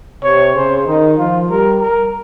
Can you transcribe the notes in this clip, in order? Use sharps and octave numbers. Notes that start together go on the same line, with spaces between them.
C3 C#5
C#3 C5
D#3 D#4
F3 F4
G3 A#4
A#4